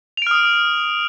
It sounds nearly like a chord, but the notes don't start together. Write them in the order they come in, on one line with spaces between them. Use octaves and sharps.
F7 D7 F6 D#6